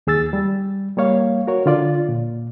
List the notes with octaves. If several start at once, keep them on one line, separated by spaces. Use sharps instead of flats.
D#2 G#4 E6 A6
G3
G3 A#3 C#5 F5
F#4 A#4 C#5
D3 F4 D5
A#2